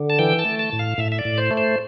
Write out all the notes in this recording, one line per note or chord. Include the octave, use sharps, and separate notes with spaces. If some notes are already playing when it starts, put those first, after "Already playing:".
Already playing: D3
A5
E3 G5
A5
A3
A5
A2
F5
A2 E5
E5
D5
A2
C5
A3
C5